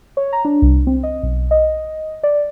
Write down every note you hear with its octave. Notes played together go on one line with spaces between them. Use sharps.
C#5
A#5
D4
C2
C4
D#5
B1
D#5
D5